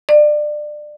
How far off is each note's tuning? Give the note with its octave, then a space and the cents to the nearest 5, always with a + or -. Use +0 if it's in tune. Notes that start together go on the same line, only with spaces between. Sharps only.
D5 +25